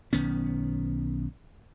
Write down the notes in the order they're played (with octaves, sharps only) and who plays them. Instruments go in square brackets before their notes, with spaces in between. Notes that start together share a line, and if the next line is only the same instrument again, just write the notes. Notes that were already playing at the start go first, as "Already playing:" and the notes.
[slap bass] B1 D#3 B3 C#4